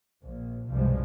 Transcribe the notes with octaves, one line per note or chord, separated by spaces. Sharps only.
A#1
C2 G2 B2 F3 G3 G#3